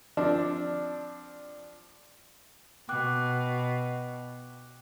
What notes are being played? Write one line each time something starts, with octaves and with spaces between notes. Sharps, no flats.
F3 C4 D4
B2 G5 D6 F#6